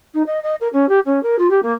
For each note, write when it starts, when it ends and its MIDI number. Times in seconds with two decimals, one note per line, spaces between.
0.14 0.22 63
0.26 0.42 75
0.43 0.55 75
0.61 0.68 70
0.73 0.86 61
0.89 0.99 67
1.05 1.21 61
1.23 1.36 70
1.39 1.47 65
1.50 1.62 67
1.62 1.73 58